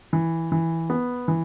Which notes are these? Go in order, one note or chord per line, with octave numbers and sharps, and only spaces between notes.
E3
E3
B3
E3